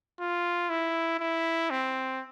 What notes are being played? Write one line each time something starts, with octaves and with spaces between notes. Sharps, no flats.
F4
E4
E4
C4